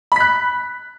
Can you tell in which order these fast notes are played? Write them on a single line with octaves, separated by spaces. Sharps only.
B5 B6 F#6